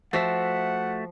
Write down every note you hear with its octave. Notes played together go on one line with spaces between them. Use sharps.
F3 A3 F#4 E5 F#5